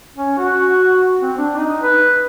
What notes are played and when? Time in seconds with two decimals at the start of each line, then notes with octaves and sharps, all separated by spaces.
0.15 C#4
0.38 F#4
1.21 C4
1.38 D4
1.56 D#4
1.83 B4